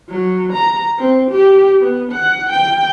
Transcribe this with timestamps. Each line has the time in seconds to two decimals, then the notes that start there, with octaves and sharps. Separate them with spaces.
0.10 F#3
0.53 A#5
0.99 C4
1.32 G4
1.80 B3
2.13 F#5
2.51 G5